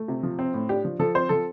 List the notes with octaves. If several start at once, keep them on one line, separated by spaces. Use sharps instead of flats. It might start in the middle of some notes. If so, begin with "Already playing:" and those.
Already playing: A3
C3
F3
C4
A2
D4 G4
F3
F3 A4
C4 C5
F3 A4